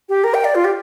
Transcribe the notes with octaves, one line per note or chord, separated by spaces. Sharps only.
G4
A#4
G5
D5
F4
G4